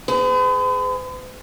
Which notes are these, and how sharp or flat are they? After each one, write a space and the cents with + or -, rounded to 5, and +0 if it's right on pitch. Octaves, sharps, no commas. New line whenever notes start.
G#4 +0 B4 +45